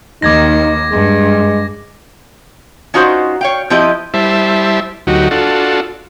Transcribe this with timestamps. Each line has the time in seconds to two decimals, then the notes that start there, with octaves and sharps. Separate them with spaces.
0.22 D#2 D#3 D#4 D6 G#6 A#6
0.92 G2 G#3
2.94 C#4 D#4 F4 F#4 A#4 C5
3.41 C#5 F5 G5
3.70 F3 C4 E4 G4 D#5
4.14 G3 E4 C5 E5 A5
5.07 D2 F#3 D#4 F#4 G4
5.31 D4 F4 F#4 A4